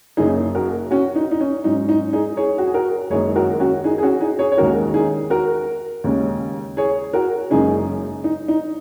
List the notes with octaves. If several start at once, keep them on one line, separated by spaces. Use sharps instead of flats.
F#1 F#2 C#3 A#3 C#4 D#4 G#4
F#4 A#4
C#4 F#4
D#4
D#4
C#4
G#2 F#3 C#4 D#4
D#4
D#4 G#4
G#4 C#5
F#4
G#4
F#4 A#4
F#1 F#2 D#3 G#3 G#4 C#5
F#4 A#4
C#4 F#4
D#4 G#4
G#4
C#4 F#4
D#4 G#4
G#4 C#5
C#5
D#2 D#3 G#3 C#4 F#4 A#4
D#4 G#4
F#4 A#4
D#2 C#3 G#3 C#4
G#4 C#5
F#4 A#4
F#1 F#2 C#3 G#3 C#4 D#4 G#4
D#4
D#4